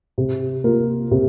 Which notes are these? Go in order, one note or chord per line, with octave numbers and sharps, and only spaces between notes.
C3
A#3 F4 A#4
C3